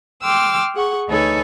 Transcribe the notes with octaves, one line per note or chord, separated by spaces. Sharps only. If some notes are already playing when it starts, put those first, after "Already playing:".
G5 C6 D6 E6 F6
G#4 F#5 C#6
D2 D#4 A4 B4 C#5 G#5